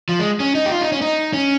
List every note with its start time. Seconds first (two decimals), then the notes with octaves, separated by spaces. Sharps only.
0.09 F3
0.19 G#3
0.40 C#4
0.55 D#4
0.66 G4
0.71 F4
0.81 D#4
0.92 C#4
1.02 D#4
1.33 C#4